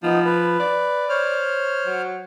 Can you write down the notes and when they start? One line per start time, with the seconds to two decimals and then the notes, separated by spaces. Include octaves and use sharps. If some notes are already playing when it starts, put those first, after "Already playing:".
0.03 F3 B3 D#4
0.26 B4
0.60 D5
1.09 C5 C#5 F6
1.87 F#3